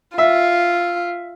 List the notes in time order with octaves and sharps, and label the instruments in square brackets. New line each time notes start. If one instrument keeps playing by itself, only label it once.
[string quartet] F4 [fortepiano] E5